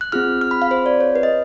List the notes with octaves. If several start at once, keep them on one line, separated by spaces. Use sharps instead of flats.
F#6
C4 F4 G#4 F6
F6
B5
F5
C5
D5
C#5
B4
D#5